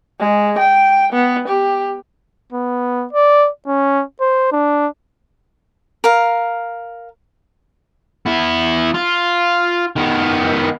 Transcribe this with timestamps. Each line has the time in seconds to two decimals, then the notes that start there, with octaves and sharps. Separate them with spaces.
0.20 G#3
0.59 G5
1.13 B3
1.48 G4
2.52 B3
3.13 D5
3.67 C#4
4.21 C5
4.52 D4
6.04 A#4 F5
8.26 B3 E4
8.94 F4
9.96 D#3 B3